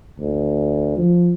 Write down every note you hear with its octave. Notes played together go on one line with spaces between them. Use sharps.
D2
F3